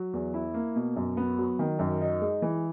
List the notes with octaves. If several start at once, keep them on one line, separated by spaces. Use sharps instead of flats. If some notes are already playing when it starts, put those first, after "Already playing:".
Already playing: F#3
E2
E4
A#3
B2
F#2
B3
F#3
D#3
F#2
D#4
G#3
E3